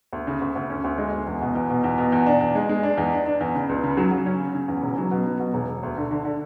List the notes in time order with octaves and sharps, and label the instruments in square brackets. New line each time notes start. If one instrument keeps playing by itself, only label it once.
[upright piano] D2
C#3
D2
D2
C#4
D2
G#3
D2
E2
B2
E2
B2
E2
B2
E2
D4
E2
G#3
G#3
D4
E2
D4
D4
E2
C#3
C#2
C#3
F#3
F#3
C#4
C#3
C#3
E2
E1
F#3
B2
F#3
B2
E1
E1
D2
D3
D3
D3